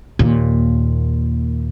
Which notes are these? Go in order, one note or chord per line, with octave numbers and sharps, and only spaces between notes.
D#2 A#2